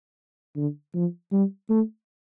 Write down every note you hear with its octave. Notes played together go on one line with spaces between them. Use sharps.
D3
F3
G3
A3